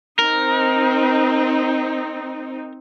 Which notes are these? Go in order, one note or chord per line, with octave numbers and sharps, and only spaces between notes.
C4 D#4 A#4